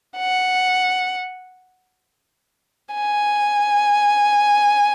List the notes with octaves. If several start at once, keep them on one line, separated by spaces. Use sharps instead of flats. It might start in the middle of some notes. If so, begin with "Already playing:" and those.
F#5
G#5